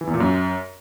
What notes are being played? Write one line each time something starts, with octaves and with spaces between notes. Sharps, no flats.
E3
E2
A#2
F#2